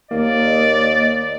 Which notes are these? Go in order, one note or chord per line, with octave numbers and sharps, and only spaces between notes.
D#2 A#3 D5 D#5